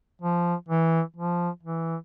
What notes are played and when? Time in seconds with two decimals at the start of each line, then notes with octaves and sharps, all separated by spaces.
0.22 F3
0.69 E3
1.17 F3
1.63 E3